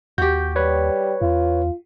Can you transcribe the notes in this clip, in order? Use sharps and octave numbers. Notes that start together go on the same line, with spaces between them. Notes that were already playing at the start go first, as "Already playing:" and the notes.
D#2 F#4 G4 G6
G3 B4 C#5
E2 F4